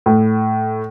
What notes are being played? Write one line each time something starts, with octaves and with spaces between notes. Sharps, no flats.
A2